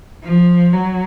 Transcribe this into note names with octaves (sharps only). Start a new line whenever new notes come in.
F3
F#3